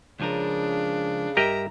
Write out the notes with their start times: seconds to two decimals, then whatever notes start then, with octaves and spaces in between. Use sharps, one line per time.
0.20 C#2 C#3 F3 D4 A#4
1.37 G2 G4 A#4 D#5 E5 A#5